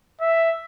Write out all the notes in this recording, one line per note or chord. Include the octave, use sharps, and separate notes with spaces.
E5